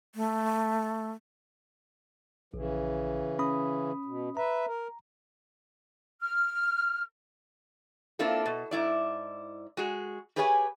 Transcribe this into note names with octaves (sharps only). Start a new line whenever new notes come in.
A3
A#1 C#3 E3
C#4 B5 D#6
B2
B4 E5 A#5
A#4
F6
A#3 C4 D4 E4 F4 A4
B2
G#2 E4 D5
G#3 F#4 G#4
G4 G#4 B4 C#5 F5 G#5